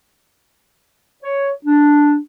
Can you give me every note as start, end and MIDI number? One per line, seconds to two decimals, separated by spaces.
1.23 1.51 73
1.65 2.17 62